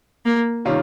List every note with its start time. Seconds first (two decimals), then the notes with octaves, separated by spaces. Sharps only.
0.25 A#3
0.65 C3 D#3 G3 C#4 F4